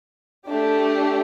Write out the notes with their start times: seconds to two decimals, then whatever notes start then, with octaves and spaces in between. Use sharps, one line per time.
0.45 A3 D4 G4